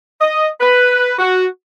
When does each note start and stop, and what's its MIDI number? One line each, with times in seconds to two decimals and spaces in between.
0.21 0.47 75
0.61 1.14 71
1.18 1.46 66